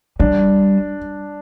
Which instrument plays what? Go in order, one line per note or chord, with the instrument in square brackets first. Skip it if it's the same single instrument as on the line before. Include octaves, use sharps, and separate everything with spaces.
[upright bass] G3 [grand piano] D4